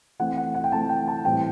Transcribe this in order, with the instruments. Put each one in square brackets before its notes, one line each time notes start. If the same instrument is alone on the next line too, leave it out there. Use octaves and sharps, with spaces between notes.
[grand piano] E3 A3 C4 F#5
F#5
F#5
G5
E3 A3 C4 A5
G5
A5
A2 E3 G3 C4 G5